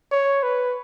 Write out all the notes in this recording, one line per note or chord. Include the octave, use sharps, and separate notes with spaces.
C#5
B4